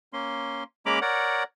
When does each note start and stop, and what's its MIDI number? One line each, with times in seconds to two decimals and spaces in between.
0.13 0.64 58
0.13 0.64 61
0.13 0.64 84
0.86 0.99 56
0.86 0.99 58
0.86 0.99 61
0.86 0.99 82
0.86 0.99 83
0.86 0.99 86
1.02 1.44 70
1.02 1.44 73
1.02 1.44 74
1.02 1.44 78